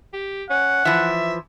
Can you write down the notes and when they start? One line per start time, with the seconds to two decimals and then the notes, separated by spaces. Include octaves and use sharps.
0.13 G4
0.50 C#4 F#5
0.85 E3 F3 E5